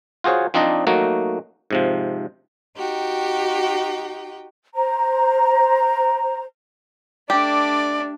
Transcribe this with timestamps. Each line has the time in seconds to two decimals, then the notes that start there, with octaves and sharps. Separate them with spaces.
0.24 F4 F#4 G#4 C5 C#5
0.54 F3 C4 D4 D#4 D5 D#5
0.87 F#3 A3 A#3 D#4 F#4
1.71 G#2 C3 F3
2.76 D#4 F#4 G4 G5
4.75 C5 A#5
7.30 A3 D4 G4 D5